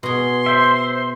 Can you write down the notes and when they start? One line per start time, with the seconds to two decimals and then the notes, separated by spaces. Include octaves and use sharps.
0.03 B2 G#4 C6
0.46 C5 E5